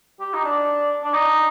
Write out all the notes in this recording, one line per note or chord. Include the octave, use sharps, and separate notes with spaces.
G4
D#4
D4
D4
D#4